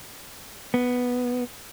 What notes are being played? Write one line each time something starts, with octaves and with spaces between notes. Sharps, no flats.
B3